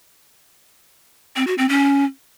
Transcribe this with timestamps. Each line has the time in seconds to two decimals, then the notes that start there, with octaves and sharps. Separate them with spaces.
1.36 C4
1.47 F#4
1.58 C4
1.69 C#4